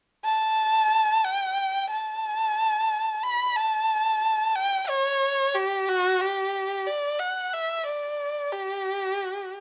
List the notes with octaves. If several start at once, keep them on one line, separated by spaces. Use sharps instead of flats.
A5
G5
A5
B5
A5
G5
C#5
G4
F#4
G4
D5
F#5
E5
D5
G4